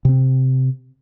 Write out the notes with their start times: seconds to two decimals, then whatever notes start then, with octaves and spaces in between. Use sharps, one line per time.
0.05 C3 C4